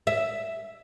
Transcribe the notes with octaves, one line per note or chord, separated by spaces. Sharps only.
E5